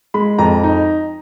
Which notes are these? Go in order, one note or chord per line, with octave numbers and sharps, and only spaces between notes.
G#3 B5
F2 A#5
D#4